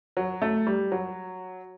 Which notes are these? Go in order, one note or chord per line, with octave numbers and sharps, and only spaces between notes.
F#3
A3
G3
F#3